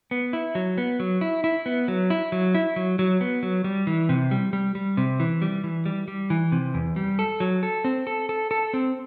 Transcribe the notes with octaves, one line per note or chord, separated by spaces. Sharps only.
B3
E4
F#3
B3
F#3
E4
E4
B3
F#3
E4
F#3
E4
F#3
F#3
B3
F#3
G3
E3
C3
G3
G3
G3
C3
E3
G3
E3
G3
G3
E3
C3
E2
G3
A4
F#3
A4
C4
A4
A4
A4
C4